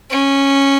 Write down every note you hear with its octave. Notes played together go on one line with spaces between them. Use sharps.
C#4